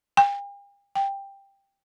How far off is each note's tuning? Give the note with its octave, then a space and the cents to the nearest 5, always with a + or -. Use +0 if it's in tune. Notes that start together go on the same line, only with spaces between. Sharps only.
G5 +45
G5 +10